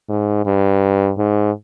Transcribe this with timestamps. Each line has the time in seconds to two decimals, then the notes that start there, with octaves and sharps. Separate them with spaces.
0.09 G#2
0.45 G2
1.18 G#2